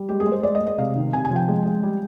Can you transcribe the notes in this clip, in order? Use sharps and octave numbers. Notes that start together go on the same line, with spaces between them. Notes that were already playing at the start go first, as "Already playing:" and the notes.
Already playing: G3
G#3 G4
G#4
G#3
C5
G#3 D5
D#5
G#3
D#5
C3 F5
D#3
C3 G#5
G#5
F3
G5
G#3
G#3
G3